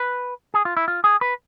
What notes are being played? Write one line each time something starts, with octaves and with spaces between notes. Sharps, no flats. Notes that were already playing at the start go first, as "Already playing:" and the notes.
Already playing: B4
G#4
F4
E4
F4
G#4
B4